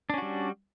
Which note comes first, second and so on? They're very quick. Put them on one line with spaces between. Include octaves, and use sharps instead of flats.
D4 C#4 F#4 G3